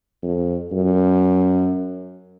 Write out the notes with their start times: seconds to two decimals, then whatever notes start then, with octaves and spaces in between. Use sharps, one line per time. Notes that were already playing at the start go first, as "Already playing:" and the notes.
0.23 F2
0.72 F#2